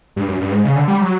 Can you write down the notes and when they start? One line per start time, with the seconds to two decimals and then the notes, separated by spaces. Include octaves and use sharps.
0.16 G2
0.28 F#2
0.41 G2
0.52 G#2
0.65 C#3
0.76 D3
0.88 G3
1.01 F#3